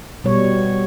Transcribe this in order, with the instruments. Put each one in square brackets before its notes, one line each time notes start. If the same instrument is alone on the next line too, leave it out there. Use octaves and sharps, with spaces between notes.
[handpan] B2 G3 C#5